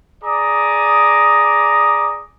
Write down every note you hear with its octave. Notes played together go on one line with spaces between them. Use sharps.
G#4 D5 A#5 D6 D#6